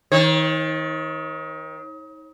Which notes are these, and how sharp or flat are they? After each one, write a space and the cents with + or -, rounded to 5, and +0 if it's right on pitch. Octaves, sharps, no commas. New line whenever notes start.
D#3 +30 C#5 -40